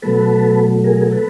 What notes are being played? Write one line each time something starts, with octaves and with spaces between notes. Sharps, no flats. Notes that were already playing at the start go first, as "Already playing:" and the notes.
B2 F#3 A3 A4 B4
G#4 A#4
A4 B4